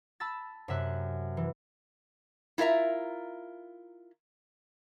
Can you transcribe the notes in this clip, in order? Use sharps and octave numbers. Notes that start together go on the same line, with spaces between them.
A5 B5 E6 A6
F#2 C3 E5 F#6
E3
E4 F4 A#4 E5 A#5